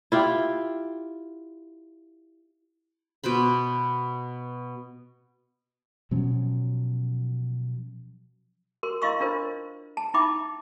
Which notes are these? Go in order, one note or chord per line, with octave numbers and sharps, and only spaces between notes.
E4 F4 G4
B2 B4 C5 B5
B2 F3 F#3 C#4
F#4 A#4 C6
E4 D#5 F5 C6 C#6 E6
D4 F4 A#4 C5
A5
D#4 E4 E5 G5 B5 D6